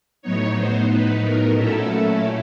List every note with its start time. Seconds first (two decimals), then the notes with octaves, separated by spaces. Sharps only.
0.22 A2 F#3 B3 D#4 C#5
0.56 C5
0.89 B4
1.23 A#4
1.56 A#2 F#3 A3 C#4 E4 A4